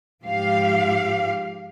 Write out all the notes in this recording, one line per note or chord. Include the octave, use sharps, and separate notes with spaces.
G#2 F3 G4 F5